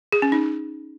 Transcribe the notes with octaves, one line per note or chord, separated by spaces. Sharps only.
G#4
C#4
D#4